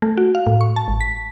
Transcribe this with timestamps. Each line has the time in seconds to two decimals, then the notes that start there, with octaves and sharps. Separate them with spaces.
0.02 A3
0.17 F#4
0.35 F5
0.47 A2
0.61 C#6
0.76 A5
0.88 G#1
1.01 B6